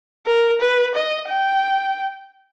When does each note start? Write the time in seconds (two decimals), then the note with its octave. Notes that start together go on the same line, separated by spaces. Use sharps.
0.26 A#4
0.61 B4
0.95 D#5
1.29 G5